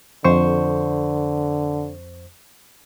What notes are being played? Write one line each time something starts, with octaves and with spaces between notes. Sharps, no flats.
F2 D3 C5 C#6